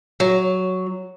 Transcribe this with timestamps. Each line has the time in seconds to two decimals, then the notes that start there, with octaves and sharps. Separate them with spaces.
0.20 F#3